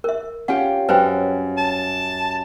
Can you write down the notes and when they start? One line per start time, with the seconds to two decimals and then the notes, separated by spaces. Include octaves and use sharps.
0.04 A#4 E5
0.48 C#4 F4 G4 F#5
0.89 F#2 B4 C5 G5
1.58 A5